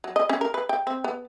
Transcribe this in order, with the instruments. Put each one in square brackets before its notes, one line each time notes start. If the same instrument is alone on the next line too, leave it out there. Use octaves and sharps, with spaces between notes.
[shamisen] F#3
D#5
C#4
A#4
B4
G5
C4
B3